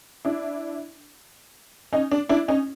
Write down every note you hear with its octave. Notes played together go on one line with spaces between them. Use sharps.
D4 E4
C#4 D#4
D4
D4 E4
C#4 D#4